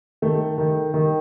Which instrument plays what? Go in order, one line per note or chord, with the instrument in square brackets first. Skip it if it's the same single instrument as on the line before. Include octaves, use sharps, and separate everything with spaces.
[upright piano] D#3 A3
D#3
D#3